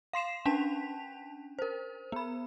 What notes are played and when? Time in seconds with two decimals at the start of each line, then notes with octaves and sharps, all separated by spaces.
0.13 F5 C6 C7 E7
0.45 C#4 D4 A5 B6 F7
1.59 A#4 C5
2.12 B3 B5